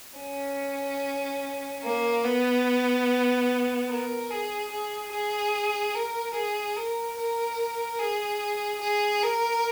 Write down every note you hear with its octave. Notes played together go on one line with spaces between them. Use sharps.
C#4
A#3
B3
A#4
G#4
G#4
G#4
A#4
G#4
A#4
A#4
G#4
G#4
A#4